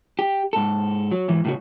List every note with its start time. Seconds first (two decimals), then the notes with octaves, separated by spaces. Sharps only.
0.19 G4
0.53 G#2 A4
1.11 F#3
1.28 G#2 E3
1.45 A2 C#3 F#4